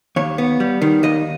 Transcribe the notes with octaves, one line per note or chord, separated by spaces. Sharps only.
D#2 C#5
B3
G3
D#3
D#2 D#5